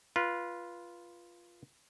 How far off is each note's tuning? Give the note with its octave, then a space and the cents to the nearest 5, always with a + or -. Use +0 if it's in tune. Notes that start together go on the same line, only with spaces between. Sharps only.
F4 -5 B4 -20